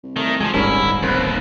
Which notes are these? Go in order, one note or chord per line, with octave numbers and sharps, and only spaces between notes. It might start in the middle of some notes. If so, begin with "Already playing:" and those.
C2
C2 D#3 A3
F3 F#3 G#3 G#5 A5
D1 G1 G#2 G3 C#4 E4 A#4
F1 D#2 B4 C5